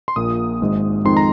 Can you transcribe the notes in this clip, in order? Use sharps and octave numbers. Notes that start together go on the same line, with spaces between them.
C6
A#1 A#2 A#3 D#6
G#1 G#2 G#3
F2 D#3 G#3 C4 D#4 C6
A#5